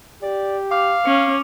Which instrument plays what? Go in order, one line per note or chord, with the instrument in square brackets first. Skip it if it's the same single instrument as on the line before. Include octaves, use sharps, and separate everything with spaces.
[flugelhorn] G4 [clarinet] D5
[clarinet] F5 [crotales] D6
[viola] C#4 [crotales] C#7